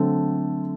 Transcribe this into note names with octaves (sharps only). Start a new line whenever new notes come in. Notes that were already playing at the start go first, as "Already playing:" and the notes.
Already playing: D3 F#3 A3 C4